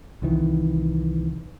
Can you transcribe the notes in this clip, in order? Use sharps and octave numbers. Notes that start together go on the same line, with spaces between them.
C2 D#3 E3